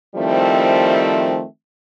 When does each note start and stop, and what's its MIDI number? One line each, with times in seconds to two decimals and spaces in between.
0.16 1.43 51
0.16 1.43 53
0.16 1.43 55
0.16 1.43 57
0.16 1.43 60
0.16 1.43 64